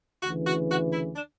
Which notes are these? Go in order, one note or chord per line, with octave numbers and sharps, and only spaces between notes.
D2 C#3 E3 F#4
F#4
F#4
E4
D4